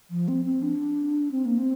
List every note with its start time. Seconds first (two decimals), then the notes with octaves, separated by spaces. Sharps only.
0.10 F3
0.28 C4
0.45 C4
0.62 D4
1.32 C4
1.45 A#3
1.58 C4